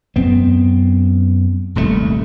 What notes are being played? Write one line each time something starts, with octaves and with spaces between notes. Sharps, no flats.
F#2 B3 C4
D#1 C2 A#2 A3